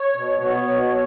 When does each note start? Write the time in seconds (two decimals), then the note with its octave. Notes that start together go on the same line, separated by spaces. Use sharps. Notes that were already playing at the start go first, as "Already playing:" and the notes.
Already playing: C#5
0.16 B2
0.42 B3 C#5
0.68 B2